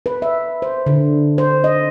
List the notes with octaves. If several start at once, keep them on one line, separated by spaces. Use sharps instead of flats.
B4
E5
C5
D3
C5
D#5